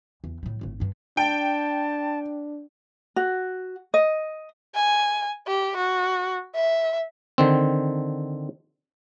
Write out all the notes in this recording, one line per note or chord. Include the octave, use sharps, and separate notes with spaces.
E2
A2 G3
G#1 A2
G2 D3
D4 G5 A5
F#4
D#5
G#5
G4
F#4
E5
D3 D#3 C4